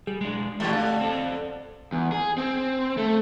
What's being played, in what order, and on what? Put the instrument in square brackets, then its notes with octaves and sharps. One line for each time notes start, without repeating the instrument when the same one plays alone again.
[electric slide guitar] G3 [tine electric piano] G#4
[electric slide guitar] G#3 D4
[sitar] E2 B2 [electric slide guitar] A3 G4
[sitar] D3 [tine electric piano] F5
[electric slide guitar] C4 A4
[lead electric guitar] E2
G#4
C4
A3